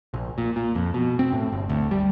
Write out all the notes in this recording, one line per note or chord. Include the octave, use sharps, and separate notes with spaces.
A#1
A#2
A#2
F2
B2
C4
A2
G1
D2
G3